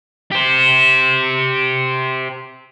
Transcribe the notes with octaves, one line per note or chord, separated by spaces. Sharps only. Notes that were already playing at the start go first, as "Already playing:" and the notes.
G4 C5